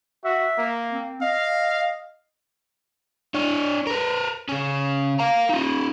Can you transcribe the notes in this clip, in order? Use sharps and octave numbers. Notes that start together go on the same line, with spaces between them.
F#4 E5
A#3
C4
D#5 F5
D4 C#5
A#4 B4
C#3 C#4
F5 A#5
D#4 F4